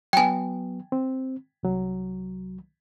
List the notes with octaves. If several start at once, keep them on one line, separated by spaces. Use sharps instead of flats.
F#3 B3 G5 G#5
C4
C2 F#3